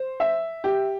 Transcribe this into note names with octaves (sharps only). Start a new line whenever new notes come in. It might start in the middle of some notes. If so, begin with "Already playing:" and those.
Already playing: C5
E5
G4